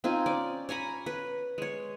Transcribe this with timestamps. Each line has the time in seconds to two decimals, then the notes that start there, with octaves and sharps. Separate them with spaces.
0.04 C4 D#4 F4 G#5
0.26 C#4 D5
0.69 C#5 G#5 A#5 B5
1.06 B4
1.58 G#3 C#5